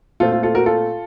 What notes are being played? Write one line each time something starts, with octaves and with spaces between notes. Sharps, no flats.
A#2 A3 C4 F4 A4
F4
F4 A4
F#4 A#4
F4 A4